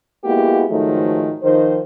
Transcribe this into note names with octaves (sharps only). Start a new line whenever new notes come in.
G#3 A#3 B3 E4 F#4 G4
G#2 D#3 F3 F#3 A3
D#3 F3 C5